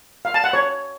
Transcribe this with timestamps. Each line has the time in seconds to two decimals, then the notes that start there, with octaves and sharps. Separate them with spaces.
0.25 F5
0.34 A5
0.44 F#5
0.53 C#5